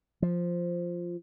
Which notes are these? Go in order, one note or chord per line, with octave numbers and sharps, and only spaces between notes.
F3